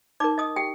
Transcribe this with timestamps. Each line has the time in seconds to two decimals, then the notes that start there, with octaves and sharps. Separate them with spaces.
0.20 D#4 A#4 D5 D6
0.38 D#5 D#6
0.56 G4 G5